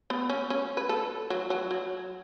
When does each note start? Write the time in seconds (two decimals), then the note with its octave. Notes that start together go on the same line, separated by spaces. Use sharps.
0.10 B3
0.30 C#4
0.50 C#4
0.77 B4
0.89 A4
1.30 F#3
1.50 F#3
1.71 F#3